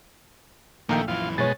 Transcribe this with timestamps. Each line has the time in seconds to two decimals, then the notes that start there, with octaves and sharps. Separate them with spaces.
0.89 A#1 D#3 A3 A#3 F5 G5
1.08 F#2 E3 F4
1.38 B2 G#3 C#5 A6